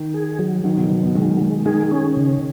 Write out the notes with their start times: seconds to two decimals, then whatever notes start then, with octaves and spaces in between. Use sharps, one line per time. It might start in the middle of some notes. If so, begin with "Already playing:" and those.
Already playing: D#3
0.14 G#4
0.39 F#3
0.64 D#3 F#3
0.77 B2
0.90 B2 F#3
1.03 B2
1.15 D#3 G#3
1.41 G#3
1.66 D#3 G#4
1.91 C#4
2.17 C#3